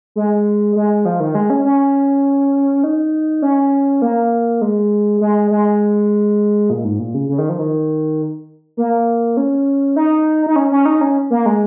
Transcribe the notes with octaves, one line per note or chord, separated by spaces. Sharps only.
G#3
G#3
F3
D#3
G#3
C#4
C#4
D#4
C#4
A#3
G#3
G#3
G#3
A#2
G#2
A#2
C#3
C#3
D#3
F3
D#3
A#3
C#4
D#4
D#4
C#4
C#4
D#4
C#4
A#3
G#3